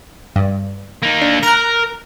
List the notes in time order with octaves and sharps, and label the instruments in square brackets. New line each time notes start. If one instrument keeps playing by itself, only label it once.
[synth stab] G2
[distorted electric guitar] A#3 D#4
[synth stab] D4
[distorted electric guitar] A#4 [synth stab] A#5 F#6